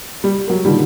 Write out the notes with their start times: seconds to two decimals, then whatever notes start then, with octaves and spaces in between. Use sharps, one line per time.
0.24 G3
0.47 F#3 A#4
0.65 A#2 D3 D#3 G3